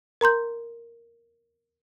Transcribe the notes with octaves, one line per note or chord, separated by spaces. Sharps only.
A#4 A#5 C6 G6